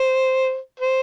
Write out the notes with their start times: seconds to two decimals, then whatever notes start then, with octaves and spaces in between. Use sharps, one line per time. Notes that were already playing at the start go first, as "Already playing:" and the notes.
Already playing: C5
0.80 C5